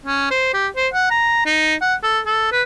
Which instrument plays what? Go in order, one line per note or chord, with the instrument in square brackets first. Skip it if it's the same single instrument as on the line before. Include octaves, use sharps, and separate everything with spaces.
[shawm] C#4
C5
G4
C5
F#5
A#5
D#4
F#5
A4
A4
B4